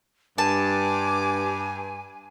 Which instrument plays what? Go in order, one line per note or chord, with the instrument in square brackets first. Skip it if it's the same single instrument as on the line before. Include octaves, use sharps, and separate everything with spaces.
[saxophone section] G2 [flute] G#5 [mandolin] A5 [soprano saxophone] D6